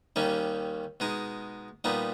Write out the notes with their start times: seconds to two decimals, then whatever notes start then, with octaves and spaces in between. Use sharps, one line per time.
0.16 D#2 D#3 G3 C#4
1.00 B2 G#3 D#4
1.84 A#2 G3 B3 D#4